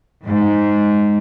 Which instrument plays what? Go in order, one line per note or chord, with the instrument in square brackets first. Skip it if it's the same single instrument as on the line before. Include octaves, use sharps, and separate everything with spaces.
[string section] G#2